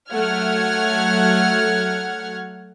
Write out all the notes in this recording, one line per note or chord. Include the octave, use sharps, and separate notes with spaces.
F#3 A3 F#5 F6 G#6